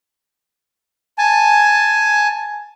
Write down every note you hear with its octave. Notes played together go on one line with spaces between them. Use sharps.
G#5 A5